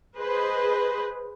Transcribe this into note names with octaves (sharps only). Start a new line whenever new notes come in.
G#4 B4 C5 D#5